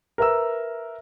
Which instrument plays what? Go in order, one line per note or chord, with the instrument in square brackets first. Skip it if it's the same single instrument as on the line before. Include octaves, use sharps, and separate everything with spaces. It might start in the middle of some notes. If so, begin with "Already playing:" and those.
[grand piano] A#4 B4 E5 A#5 E6